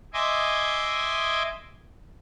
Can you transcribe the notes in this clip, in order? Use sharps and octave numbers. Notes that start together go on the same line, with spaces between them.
D#5 E5 G#5 C6 D6